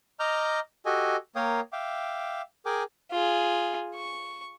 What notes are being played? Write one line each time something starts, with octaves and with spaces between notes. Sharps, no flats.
D#5 A#5 D6 F6 G6
F#4 G4 A4 D#5 G#5
A#3 A#4 C#5 F5 G5 D#6
E5 F5 G5 D6
G#4 A#4 G5 G#5 D6
F4 G#4
C#6